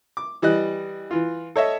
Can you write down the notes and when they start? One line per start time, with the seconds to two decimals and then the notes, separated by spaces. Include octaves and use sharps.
0.17 D6
0.42 E3 G3 D#5 F#6
1.11 E3 F4
1.56 A4 C#5 D#5 E5